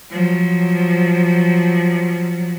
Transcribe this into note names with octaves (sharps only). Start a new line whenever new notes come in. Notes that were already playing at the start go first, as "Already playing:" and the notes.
F3 F#3